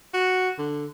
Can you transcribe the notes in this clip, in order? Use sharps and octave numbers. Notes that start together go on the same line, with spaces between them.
F#4
D3